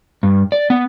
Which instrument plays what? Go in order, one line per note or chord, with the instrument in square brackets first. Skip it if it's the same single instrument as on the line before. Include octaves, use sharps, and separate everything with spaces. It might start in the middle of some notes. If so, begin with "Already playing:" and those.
[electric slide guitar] G2
D5
B3